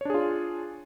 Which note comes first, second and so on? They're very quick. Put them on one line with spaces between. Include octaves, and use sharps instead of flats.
C#5 D4 G#4 F4